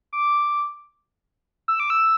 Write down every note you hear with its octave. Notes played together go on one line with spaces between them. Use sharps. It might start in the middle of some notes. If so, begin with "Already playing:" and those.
D6
E6
D6
E6